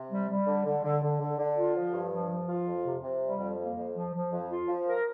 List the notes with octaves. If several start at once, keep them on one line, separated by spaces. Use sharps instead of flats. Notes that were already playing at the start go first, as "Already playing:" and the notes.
Already playing: C3
G3
G3
D3
D3
D3
D3
D3
D3
F4
F3
G2
F3
F3
F4
F2
C3
C3
G3
F2
A#3
F2
F3
F3
F2
F4
F3
A#4